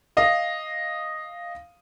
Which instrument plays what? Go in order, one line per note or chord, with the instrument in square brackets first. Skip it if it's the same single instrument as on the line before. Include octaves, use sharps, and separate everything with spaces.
[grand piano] D#5 F5